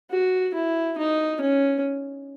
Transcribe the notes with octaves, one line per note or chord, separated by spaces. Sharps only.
F#4
E4
D#4
C#4